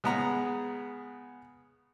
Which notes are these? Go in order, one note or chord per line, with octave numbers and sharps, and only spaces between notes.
C#3 G#3 B3 F#5 A#5